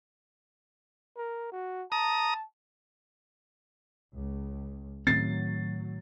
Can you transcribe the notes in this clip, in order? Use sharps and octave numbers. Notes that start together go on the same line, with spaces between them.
A#4
F#4
A5 A#5 D#6
C#2
A2 D#3 F#3 C4 A6 C7